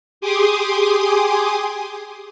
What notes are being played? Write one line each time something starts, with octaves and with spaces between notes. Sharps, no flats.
G4 G#4 G#5 C6 D6 D#6